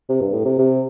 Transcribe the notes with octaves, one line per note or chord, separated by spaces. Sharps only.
C3
G2
A2
C3
C3